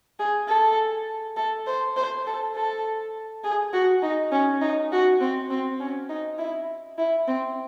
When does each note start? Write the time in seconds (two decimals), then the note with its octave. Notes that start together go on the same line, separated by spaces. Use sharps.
0.19 G#4
0.48 A4
1.37 A4
1.67 C5
1.96 C5
2.27 A4
2.56 A4
3.44 G#4
3.73 F#4
4.03 D#4
4.32 C#4
4.61 D#4
4.92 F#4
5.20 C4
5.50 C4
5.80 C#4
6.09 D#4
6.39 E4
6.98 E4
7.28 C4